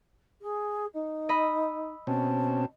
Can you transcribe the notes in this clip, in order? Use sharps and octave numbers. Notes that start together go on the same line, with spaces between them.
G#4
D#4
D#5 B5 E6
B2 C4 C#4 A5